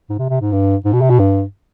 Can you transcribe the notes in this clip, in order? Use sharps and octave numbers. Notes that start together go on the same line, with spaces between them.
G#2
C3
C3
G#2
G2
G#2
B2
C3
B2
G2